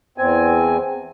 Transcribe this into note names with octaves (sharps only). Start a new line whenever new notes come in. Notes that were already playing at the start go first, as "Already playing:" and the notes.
E2 C4 G#5